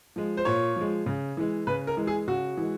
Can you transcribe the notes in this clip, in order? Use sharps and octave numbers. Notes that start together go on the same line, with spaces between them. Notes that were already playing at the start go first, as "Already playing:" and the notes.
F3 G#3
C5
A#2 C#5
F3 G#3
C#3
E3 G#3
C#3 B4
A#4
E3 G#3
G#4
C#3 F#4
E3 G#3